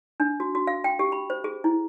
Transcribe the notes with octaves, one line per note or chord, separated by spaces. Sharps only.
D4
F#4
F#4
F5
G5
G4
B5
C5
G#4
E4